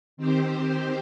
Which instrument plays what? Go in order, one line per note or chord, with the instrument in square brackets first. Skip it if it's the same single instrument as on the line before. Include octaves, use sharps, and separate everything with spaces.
[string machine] D#3 C4 G4 C5